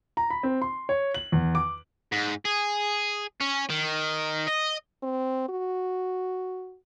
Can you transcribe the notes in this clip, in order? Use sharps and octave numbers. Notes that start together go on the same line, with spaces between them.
A#5
B5
C4
C6
C#5
F#7
E2
D6
G#2
G#4
C#4
D#3
D#5
C4
F#4